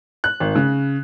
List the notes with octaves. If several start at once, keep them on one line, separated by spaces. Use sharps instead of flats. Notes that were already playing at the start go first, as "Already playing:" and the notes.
F#6
G#1
C#3